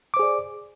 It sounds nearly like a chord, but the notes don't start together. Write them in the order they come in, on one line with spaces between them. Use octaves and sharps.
D6 C5 G#4 D5